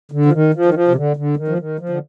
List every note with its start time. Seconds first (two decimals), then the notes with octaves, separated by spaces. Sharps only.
0.12 D3
0.26 F3
0.33 D#3
0.54 F3
0.65 D#3
0.74 F3
0.88 C3
0.96 D3
1.16 D3
1.37 D#3
1.48 F3
1.58 D#3
1.80 F3
1.89 D3